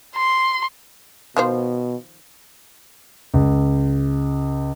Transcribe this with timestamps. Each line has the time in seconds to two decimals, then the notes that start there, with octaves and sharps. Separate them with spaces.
0.15 C6
1.37 B2 D#3 F3 C5
3.34 C#2